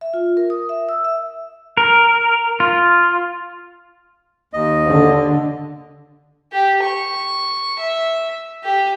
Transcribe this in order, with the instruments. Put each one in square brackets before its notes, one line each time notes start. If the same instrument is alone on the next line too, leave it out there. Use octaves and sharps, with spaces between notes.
[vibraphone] E5
F4
A#4
D#6
E5
E6
E5
[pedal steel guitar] A#4
F4
[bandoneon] D#2 D#5
[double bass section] D3
[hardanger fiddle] G4
C#6
E5
G4